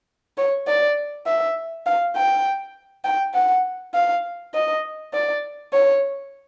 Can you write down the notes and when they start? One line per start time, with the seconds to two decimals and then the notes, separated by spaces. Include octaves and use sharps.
0.38 C#5
0.68 D5
1.27 E5
1.86 F5
2.16 G5
3.04 G5
3.34 F#5
3.94 F5
4.54 D#5
5.14 D5
5.73 C#5